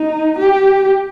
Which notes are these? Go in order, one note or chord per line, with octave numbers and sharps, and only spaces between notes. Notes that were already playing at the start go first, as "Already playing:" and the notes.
Already playing: D#4
G4